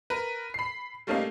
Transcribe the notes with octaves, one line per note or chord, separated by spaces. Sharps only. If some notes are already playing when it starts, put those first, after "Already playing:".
A#4 B4
B5 C7
G3 A3 A#3 C#4 D#4 F5